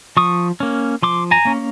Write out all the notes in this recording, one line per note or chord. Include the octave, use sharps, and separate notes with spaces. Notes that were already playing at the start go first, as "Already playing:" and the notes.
F3 C#6 D#6
A#3 C#4
F3 C6 D6
G#5 A#5
A#3 C#4